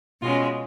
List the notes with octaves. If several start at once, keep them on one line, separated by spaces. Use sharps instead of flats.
B2 G#3 C#4 F4